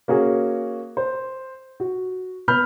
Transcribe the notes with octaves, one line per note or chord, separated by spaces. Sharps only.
A#3 C#4 F#4 G#4
C5
F#4
B3 B5 F6 G6